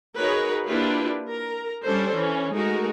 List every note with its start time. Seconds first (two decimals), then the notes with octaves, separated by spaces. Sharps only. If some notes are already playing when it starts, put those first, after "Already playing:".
0.17 D#4 F#4 G#4 A#4 B4 C#5
0.67 A#3 D4 E4 F4 G4 B4
1.28 A#4 A#5
1.84 G3 C#4 D4 A4 C5
2.12 E3 C#4
2.53 G#3 A3 D#4 F#4 A#4